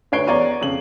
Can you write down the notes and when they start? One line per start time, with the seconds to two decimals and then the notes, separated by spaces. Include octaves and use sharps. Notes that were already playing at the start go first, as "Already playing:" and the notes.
0.12 D2 B4 C#5 C7 D7 G7
0.27 E2 C#5 D5 A#5 C#6 D#7
0.61 F2 C#3 F#7